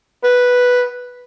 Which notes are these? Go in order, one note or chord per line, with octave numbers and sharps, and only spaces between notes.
B4